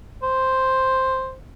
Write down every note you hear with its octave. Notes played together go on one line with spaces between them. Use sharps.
C5